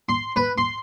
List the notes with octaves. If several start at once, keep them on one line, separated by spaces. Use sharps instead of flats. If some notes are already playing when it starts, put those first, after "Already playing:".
C6
B4
C6